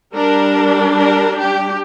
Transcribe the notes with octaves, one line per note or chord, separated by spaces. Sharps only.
G3 D4 A#4
A#4
G4